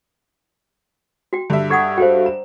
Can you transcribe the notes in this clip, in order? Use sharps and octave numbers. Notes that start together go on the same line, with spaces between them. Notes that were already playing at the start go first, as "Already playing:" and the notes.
F#4 G5
G2 D3 E5
A4 F#5 C#6 D#6 G#6
F#4 A4 C5 F5 G5
A#5